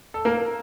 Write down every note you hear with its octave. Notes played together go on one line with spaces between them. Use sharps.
A4
A#3 A#4